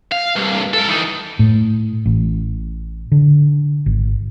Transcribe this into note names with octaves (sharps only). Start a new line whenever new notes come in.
F5
C2 G2
A4 A#4
E3 D#4
A2
A1
D3
G#1